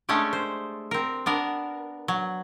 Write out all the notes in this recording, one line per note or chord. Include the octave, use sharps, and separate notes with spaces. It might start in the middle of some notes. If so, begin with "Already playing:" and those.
G#3 A3 C#4 D4 G4
C5
C4 A#4
B3 D4 A#4
F#3